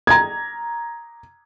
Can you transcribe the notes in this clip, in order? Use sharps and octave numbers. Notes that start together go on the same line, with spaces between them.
A#5 G#6